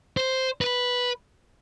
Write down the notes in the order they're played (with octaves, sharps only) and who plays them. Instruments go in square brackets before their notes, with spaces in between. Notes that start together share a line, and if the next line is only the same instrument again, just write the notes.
[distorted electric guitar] C5
B4